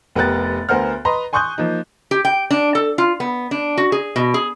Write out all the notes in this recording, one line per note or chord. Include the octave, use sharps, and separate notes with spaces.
F1 B3 G4 A#4 F#6 A6
D2 B3 A#4 C5 F#5 F6
B4 D#5 A#5 C6
G#5 C6 C#6 D#6 F#6 G6
F3 A#3 D#4
G4
G5
D4
A4
F4
B3
D4
F#4
G#4
B2
G#4